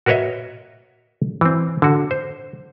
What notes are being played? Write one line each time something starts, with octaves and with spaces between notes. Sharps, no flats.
F#4 A#4 B4 C#5 D#5 E5
E3 C4
D3 F#4
C5